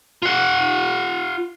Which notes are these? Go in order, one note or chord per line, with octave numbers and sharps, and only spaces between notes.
F4 F#5